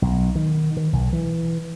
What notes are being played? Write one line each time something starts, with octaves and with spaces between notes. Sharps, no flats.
B1
D#3
D#3
B1
E3